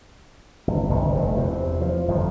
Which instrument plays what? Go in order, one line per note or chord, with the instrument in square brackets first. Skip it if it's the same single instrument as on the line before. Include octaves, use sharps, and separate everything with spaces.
[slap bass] G1
G1 C2 G2 D#3
F1 G2
E2 C3
F3
G1 F2 C#3 F3